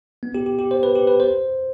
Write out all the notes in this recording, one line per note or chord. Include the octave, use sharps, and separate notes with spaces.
B3
G4
G4
G4
C5
B4
G4
B4
C5